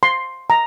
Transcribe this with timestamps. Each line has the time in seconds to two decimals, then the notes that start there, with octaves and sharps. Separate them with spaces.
0.03 C6
0.50 A#5